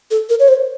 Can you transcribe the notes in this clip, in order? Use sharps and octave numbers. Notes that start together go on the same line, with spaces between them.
A4
A#4
C#5
C5